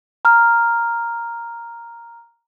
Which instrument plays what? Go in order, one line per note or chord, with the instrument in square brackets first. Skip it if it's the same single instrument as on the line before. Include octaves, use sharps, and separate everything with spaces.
[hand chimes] A#5 F6